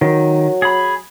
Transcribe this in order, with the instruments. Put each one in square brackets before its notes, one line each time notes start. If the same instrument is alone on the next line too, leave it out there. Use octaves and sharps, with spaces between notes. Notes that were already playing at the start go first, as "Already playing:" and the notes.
[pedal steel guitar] D#3 [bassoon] F#3
[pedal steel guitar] G#4 B5